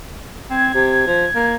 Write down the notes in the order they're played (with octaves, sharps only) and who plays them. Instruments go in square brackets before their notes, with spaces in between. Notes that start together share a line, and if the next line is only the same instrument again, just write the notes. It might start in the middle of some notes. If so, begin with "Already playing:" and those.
[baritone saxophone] C4 [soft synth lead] G#6
[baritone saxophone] C3
F3
A#3